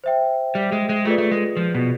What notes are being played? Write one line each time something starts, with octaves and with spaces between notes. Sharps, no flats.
C5 E5 G5
G3
G#3
G#3
A3 F4 G#4 B4 D5
A3
G#3
F3
B2